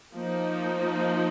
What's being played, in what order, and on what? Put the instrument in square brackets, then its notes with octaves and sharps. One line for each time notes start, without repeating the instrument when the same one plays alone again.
[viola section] F3 A#3 D#4